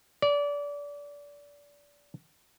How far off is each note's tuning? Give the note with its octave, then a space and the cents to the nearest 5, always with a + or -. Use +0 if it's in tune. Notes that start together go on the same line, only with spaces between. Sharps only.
D5 -25